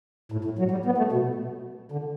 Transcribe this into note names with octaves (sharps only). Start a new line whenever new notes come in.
A2
A2
F#3
G3
B3
A3
B2
D3